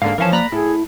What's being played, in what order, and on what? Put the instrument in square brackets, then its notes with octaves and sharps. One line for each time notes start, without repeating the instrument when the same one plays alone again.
[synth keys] G#2 D3 A#3 [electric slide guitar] F5
[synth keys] E3 C#4 [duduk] F3 [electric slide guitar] A#4 F5 A5
[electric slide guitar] A#3 D5 A#5 [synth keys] B5 F#6 A#6
[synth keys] A2 A4 [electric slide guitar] E4 [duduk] G#4